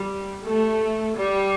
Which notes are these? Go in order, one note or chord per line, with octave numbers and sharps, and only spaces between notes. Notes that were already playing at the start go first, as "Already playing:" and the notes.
Already playing: G3
A3
G3